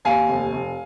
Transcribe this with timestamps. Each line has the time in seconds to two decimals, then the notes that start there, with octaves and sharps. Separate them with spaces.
0.05 D#2 F5 G#5
0.28 F1
0.52 F1